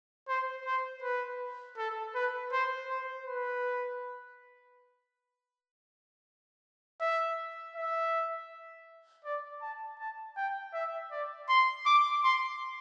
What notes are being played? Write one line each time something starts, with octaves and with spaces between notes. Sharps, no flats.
C5
C5
B4
A4
B4
C5
C5
B4
E5
E5
D5
A5
A5
G5
E5
D5
C6
D6
C6